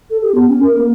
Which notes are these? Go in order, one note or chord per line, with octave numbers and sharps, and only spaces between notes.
A4
G4
B3
C#4
A#4
A#3